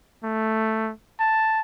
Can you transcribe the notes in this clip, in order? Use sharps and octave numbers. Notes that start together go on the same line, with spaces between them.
A3
A5